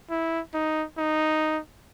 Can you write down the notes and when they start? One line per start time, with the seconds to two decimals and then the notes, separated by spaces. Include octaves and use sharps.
0.10 E4
0.54 D#4
0.98 D#4